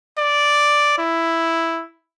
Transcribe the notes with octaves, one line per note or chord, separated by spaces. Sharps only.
D5
E4